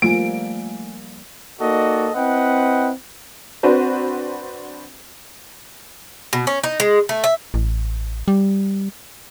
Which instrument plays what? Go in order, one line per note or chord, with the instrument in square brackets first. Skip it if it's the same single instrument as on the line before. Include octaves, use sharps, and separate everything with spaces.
[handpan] F3 G3 A#3 [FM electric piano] A3 F4 G#5 [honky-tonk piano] D7
[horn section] A#3 D#4 F#4 A4 D5 D#5
C4 E4 B4 D#5 F#5 G5
[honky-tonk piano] C4 D4 F#4 B4 C5
[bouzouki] B2
C#4
D#4
G#3
A3
E5
[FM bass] A1
G3